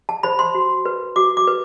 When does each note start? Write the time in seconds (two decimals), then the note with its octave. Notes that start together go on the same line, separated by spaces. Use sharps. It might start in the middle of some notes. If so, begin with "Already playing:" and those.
0.09 A5
0.23 C5 B5
0.39 C6
0.55 F#4
0.85 B4
1.16 F#4 D6
1.37 D6
1.47 B4